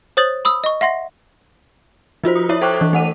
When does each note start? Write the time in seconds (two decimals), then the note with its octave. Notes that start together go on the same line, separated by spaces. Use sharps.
0.17 C5 C#5 D#6 A6 F#7
0.45 B5 D#6 E6
0.64 D#5 C#6
0.81 E5 F#5 C6 A#6
2.24 F3 F4 F#4 C5
2.36 D#6
2.49 E4 C#5 E5
2.61 A4 C5 G5 C#6 D6 F#6
2.81 E3
2.93 A3 F#5 D#7